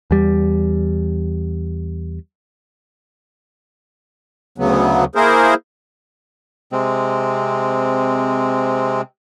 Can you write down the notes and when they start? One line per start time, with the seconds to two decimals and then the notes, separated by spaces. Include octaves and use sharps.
0.11 E2 G3
4.58 D2 C#3 F#3 B3
5.15 A#3 E4 G#4 A#4 C5
6.72 C3 G#3 C4